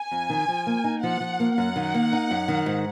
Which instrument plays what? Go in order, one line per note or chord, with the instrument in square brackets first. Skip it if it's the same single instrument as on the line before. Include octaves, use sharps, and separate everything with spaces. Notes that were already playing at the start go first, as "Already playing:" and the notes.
Already playing: [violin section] G#5
[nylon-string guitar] F2
D#3
F3
A#3
D#4
[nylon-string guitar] F3 [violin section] F#5
[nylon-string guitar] F3
A#3
[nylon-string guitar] F#2 [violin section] F#5
[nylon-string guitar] D#3
A#3
D#4
F#2
D#3
G#2